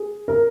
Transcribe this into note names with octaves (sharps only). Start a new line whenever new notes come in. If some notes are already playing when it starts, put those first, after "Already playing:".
Already playing: G#4
A#4